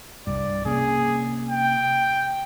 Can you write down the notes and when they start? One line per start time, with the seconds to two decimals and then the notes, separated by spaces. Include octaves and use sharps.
0.27 C2 G2 D5
0.65 C3 A#3 C#4 G#4
1.50 G5